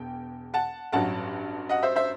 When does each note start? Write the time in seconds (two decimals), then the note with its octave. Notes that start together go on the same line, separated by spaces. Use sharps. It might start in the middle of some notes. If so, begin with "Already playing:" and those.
Already playing: E1 E2 G5
0.54 F#5 A5
0.92 A1 G2 F#3 F#5 A5
1.69 D#5 F#5
1.83 C5 E5
1.96 C5 E5